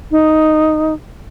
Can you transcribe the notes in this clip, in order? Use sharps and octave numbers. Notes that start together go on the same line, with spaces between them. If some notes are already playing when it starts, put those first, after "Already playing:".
D#4